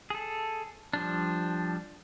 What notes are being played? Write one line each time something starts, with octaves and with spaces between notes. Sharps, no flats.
G#4 A4
F3 G3 D4